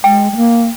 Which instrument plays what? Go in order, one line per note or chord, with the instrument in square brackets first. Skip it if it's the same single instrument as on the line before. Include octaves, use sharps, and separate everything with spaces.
[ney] G#3 [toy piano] G5
[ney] G#3
A#3